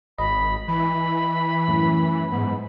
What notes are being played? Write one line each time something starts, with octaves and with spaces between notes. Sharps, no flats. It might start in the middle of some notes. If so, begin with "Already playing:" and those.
G#1 D#5 B5
E3 B5
F#2 A2
G#2 B3